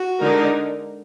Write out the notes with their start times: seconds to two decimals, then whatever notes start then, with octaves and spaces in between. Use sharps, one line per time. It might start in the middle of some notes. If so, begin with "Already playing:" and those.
Already playing: F#4
0.19 D3 G#3 D#4 A#4